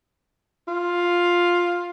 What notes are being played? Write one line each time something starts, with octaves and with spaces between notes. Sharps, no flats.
F4